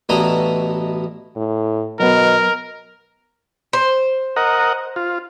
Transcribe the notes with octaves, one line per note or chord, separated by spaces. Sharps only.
A1 B2 D4 E4 D#5 A#5
A2
B2 F#3 B3 A#4 D#5
C5
A#4 D#5 F#5
F4